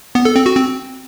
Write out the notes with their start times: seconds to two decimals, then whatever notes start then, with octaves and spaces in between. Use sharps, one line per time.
0.15 B3
0.25 A4
0.36 C4
0.46 F#4
0.56 C4